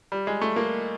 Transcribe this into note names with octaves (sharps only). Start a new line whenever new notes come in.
G3
G#3
A3
A#3